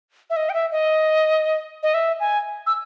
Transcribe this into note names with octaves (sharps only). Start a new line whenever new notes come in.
E5
D#5
G5
E5
D#5
D#5
E5
G#5
E6